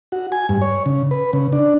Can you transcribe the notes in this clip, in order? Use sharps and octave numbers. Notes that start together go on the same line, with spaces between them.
F#4
G#5
G2
C#5
C#3
B4
C#3
D4